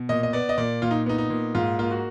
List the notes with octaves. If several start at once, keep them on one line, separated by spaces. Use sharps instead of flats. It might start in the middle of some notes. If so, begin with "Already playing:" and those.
Already playing: B2
A#2 D#5
D#5
B3 D5
D#5
A#2 D5
A#2 F4
D#4
B3 D#4
D#4
A#2
G#2 F4
A#3 F4
F#4